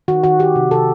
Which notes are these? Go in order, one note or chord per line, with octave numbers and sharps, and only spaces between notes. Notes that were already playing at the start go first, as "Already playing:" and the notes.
D#3 F#4
D#3 F#4
D#3 G4
C3
C3 A4